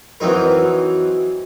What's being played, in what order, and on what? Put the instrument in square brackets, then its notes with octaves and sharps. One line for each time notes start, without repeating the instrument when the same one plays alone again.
[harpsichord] E3 F#3 C4 D#4 A#4